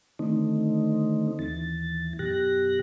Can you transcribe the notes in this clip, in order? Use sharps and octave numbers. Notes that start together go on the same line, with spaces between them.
D3 D#3 A3 C4 D#4
D#2 E3 A6
F#2 B2 G4 F#6 A#6